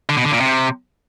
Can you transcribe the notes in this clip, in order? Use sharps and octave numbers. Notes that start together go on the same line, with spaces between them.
D3
B2
D3
A#2
C3